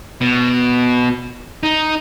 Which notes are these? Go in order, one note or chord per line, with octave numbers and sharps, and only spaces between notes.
B2
D#4